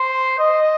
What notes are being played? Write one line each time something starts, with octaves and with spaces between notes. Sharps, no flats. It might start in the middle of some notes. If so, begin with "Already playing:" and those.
Already playing: C5
D#5